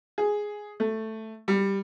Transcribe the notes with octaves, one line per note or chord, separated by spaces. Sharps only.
G#4
A3
G3